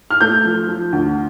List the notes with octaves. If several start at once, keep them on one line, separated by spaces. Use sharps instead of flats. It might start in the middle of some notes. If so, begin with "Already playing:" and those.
F6
A3 G6
F3
F3
D2